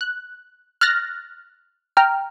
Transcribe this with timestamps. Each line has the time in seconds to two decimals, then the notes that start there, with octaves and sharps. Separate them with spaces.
0.01 F#6
0.81 F6 F#6 A6 A#6
1.97 G5 A#5 F6